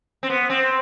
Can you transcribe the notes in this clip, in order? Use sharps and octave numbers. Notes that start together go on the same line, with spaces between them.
C4
B3
C4